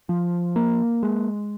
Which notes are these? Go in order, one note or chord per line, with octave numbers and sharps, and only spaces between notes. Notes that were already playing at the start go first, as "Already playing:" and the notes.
F3
A#3
G#3